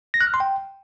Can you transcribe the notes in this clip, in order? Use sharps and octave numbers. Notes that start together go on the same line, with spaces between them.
A#6
F#6
F6
C6
G5